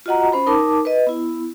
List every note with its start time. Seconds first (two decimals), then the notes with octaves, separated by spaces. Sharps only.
0.06 F4 F#4 D#5 F#5 A#5
0.32 C#4 C5 B5
0.47 D#4 A#4 A5 D6
0.85 B4 D#5
1.07 B3 E4